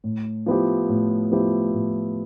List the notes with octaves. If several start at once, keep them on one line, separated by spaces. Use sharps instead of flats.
A2
F3 B3 E4 G4
A2
F3 B3 E4 G4
A2